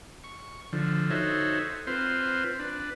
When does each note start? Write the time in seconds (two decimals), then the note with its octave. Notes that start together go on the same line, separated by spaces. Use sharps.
0.24 C#6
0.73 D3 F3
1.10 D#4 F#4 A4 C5 C#5 E5
1.87 C4 F4 B4 C5
2.59 D4 B4